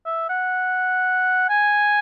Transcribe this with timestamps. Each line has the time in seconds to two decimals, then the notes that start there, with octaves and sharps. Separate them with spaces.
0.05 E5
0.29 F#5
1.49 G#5